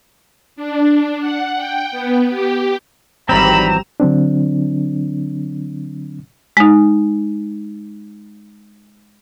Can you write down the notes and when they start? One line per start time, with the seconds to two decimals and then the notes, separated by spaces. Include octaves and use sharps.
0.56 D4
1.20 F#5
1.56 G5
1.91 B3
2.29 G4
3.29 G#1 E3 F#3 G3 C4 A#5 B5 E7
4.00 D3 F#3 C4 D4
6.57 G#3 D#4